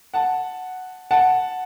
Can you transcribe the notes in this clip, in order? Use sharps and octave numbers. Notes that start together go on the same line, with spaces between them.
F#5 A5
F#5 A5